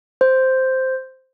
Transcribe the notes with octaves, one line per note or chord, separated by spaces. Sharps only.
C5